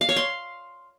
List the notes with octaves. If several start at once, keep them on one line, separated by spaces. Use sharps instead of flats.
F5
C#5
C6